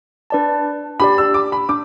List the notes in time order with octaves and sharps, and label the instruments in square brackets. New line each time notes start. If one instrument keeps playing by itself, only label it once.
[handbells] D4 B4 D5 A5
[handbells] D4 G4 D5 [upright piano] B5
[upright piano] E6
D6
B5
[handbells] D4 [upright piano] D6